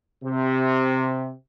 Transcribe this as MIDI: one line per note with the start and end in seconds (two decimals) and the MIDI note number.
0.23 1.32 48